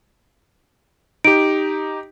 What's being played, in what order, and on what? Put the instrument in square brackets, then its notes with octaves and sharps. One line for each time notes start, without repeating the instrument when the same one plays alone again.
[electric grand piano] D#4 G4 [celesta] D7